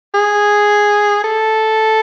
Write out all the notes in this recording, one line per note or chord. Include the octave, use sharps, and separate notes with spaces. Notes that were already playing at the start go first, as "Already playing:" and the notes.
G#4
A4